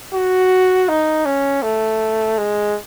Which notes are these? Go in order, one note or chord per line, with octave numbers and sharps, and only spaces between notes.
F#4
D#4
C#4
A3
G#3